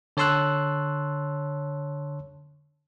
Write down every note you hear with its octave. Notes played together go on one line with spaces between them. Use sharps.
D3 C#5 A5 C6 E6 F#6